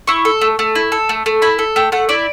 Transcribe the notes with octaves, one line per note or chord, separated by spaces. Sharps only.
E4 C#6
A4
A3
A3
E4
A4
A3
A3
E4 B5
A4
A3 G5
A3 F#5
E4 D5